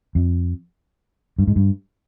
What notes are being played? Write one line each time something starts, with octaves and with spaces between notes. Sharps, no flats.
F2
G2
G#2
G2